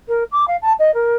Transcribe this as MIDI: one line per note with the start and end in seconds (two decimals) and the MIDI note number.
0.08 0.23 70
0.31 0.45 86
0.47 0.56 77
0.62 0.73 81
0.79 0.93 75
0.94 1.16 70